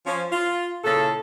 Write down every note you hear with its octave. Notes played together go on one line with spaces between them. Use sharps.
F3 C#4
F4
A#2 C#3 E4 A4